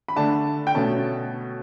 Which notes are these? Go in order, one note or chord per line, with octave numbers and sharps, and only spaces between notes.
B5
D3 A3 D4 A5
G5
B2 A3 C#4 A5